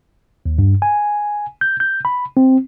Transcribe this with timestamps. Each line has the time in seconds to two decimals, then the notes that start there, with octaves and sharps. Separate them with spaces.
0.46 D#2
0.58 G2
0.82 G#5
1.61 G6
1.80 G6
2.05 B5
2.37 C4